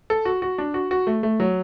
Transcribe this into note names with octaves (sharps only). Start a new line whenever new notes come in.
A4
F#4
F#4
D4
F#4
F#4
A3
A3
F#3